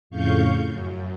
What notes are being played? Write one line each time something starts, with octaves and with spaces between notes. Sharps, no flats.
F2 A2 C#3 F5 C#6 G6
F#2